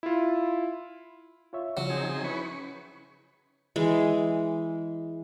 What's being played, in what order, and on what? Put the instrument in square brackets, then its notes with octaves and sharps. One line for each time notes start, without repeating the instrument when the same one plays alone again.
[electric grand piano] E4 F4
[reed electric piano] F4 C#5 E5
[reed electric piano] C#3 F3 [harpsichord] F#3
[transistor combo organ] C4 D#4 G#4
[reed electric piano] C#4 E4 [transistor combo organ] B4 C#6
[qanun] E3 G#3